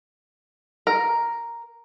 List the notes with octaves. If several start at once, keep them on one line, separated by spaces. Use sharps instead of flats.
A#4